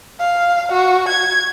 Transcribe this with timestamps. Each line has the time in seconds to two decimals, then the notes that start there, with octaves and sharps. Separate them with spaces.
0.20 F5
0.72 F#4
1.09 G#6